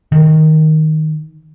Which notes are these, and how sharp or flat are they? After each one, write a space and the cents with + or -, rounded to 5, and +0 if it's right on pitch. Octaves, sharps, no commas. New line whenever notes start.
D#3 +5